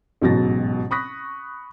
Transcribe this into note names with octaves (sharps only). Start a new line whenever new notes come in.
A1 G#2 B2 F#3 A6 A#6
B5 C#6 D#6 F#6 A#6 B6